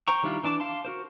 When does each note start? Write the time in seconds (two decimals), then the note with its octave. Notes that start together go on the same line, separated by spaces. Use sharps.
0.08 C5 G5 A#5 C#6
0.23 D#3 G3 D4 E4 F4
0.43 E3 D4 A5 D6
0.60 F5 A5 C6
0.85 F#4 A#4 C5